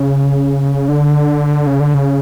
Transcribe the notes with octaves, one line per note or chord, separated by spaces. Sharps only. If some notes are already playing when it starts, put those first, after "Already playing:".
Already playing: C#3
D3
C#3
D3
C#3